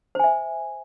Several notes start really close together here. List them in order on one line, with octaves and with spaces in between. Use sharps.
C5 G#5 E5